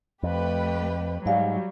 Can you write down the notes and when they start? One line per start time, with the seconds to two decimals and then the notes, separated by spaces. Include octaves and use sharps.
0.23 F2 A3 G4 B4
1.26 G#2 F#3 G3 D5 F5